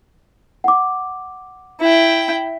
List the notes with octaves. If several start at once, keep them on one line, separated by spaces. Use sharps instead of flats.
F#5 D6
E4 G5